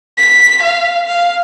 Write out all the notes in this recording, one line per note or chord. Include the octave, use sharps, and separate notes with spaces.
B6
F5
F5